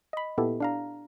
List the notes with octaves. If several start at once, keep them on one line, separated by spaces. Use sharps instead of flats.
D#5 B5
A#2 B3 E4 G4 A4
D4 F5 A#5